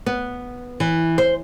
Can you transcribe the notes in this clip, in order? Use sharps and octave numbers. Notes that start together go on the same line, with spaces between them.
B3
E3
C5